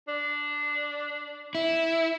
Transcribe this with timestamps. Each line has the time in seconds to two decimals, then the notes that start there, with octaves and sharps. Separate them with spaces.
0.08 D4
1.55 E4